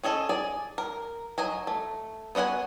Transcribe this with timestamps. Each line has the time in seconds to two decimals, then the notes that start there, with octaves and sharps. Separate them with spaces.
0.03 C#4 G#4 A4 D#5
0.29 G#4 D5
0.78 A#4
1.38 F#3 D#5 G#5 A#5
1.67 A3
2.35 B3 F#4 D#5 F#5 G#5